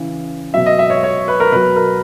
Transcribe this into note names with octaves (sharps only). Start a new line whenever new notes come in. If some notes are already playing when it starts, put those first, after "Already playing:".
Already playing: C#3 E3
B2 F#3 E5
D#5
E5
C#5
C#5
B4
A#4
B2 F#3 B4
A#4